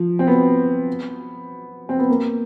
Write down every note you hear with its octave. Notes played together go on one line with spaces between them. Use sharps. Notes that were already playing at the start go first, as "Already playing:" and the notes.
Already playing: F3
C4
B3
C4
B3
A#3